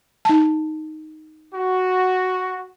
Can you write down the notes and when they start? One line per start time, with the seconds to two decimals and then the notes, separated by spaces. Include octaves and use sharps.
0.25 D#4 A5
1.54 F#4